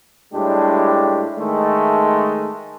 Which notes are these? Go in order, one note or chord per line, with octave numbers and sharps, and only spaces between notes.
A2 G3 G#3 D4 G4
D#3 G#3 A3